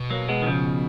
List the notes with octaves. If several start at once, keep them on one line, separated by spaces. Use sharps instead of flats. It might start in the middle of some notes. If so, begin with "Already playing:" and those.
Already playing: B2
F#3 A#3
G#3 B3
D#3
C#3 F3